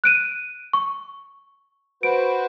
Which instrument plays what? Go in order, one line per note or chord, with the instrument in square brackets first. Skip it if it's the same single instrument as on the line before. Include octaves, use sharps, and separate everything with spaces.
[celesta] F#6 D7 D#7
C#6
[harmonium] F#4 B4 C5 [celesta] D7